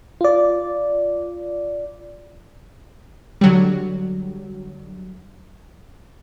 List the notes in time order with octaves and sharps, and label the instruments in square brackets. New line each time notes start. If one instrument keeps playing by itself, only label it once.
[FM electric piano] F4 D5
[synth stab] D3 F#3 G3